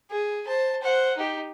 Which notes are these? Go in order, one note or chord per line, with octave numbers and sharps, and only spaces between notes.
G#4
C5 A5
C5 F#5
D#4 G4